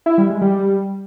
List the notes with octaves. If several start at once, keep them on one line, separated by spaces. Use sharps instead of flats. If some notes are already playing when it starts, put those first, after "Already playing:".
E4
G3
G#3
G3